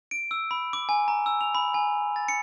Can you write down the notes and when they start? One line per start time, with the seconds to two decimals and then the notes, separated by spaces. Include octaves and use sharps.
0.11 D7
0.31 E6
0.51 B5
0.73 D6
0.89 G#5
1.08 A#5
1.26 E6
1.41 F7
1.55 B5
1.74 G#5
2.16 A6
2.28 C#7